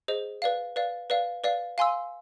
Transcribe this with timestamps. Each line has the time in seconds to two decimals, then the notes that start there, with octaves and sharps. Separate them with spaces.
0.08 G#4 C5 D#5
0.42 B4 D5 F5
0.76 B4 D5 F5
1.10 B4 D5 F5
1.44 B4 D5 F5
1.78 F5 G#5 C6 E6